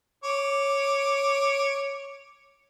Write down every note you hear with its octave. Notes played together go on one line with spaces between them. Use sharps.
C#5 D6